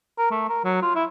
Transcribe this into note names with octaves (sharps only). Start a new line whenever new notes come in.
A#4
A3
A#4
F#3
F4
E4